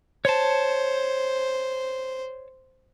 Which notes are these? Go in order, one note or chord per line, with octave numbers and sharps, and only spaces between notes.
C5 C#5 A5